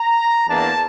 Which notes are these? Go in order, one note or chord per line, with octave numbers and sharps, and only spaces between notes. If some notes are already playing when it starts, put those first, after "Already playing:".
Already playing: A#5
E2 E3 A#3 D4 A5